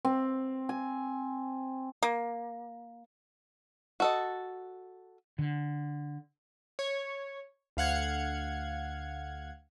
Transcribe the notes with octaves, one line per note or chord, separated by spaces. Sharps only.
C4
G#5
A#3
F#4 A4 D#5
D3
C#5
D2 F5 F#5 G#6